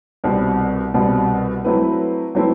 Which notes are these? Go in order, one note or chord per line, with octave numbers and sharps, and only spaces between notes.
C2 B2 G3 C4
C2 B2 G3 C4
F#3 A3 C4 E4 B4
F#3 A3 C4 E4 B4